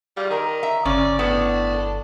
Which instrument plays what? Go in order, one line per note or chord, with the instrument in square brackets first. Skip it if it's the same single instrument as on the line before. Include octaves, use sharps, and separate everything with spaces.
[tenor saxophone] G3 [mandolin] F4 G#4 F5
[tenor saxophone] D#3 [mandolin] A#4 D5 A#5
[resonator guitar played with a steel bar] E5
[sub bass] G1 [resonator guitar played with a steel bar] C#3 C#4 [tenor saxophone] D5 [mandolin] C6
[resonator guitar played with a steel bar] A2 B3 [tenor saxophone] D4
[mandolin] A4